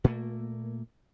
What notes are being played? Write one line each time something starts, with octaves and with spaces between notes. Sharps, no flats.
A#2 A3 A#3